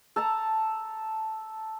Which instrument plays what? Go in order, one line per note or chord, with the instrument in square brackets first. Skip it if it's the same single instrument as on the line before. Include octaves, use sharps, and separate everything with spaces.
[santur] A4 A5 A#5